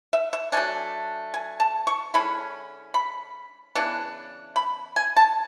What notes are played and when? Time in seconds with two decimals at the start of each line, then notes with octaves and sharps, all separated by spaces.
0.13 E5
0.33 E5
0.52 F#3 A3 D4 G#5
1.34 G#5
1.60 A5
1.87 C#6
2.14 D3 G#3 C#4 E4 B5
2.94 B5
3.75 C#3 E3 B3 D4
4.56 B5
4.96 G#5
5.16 A5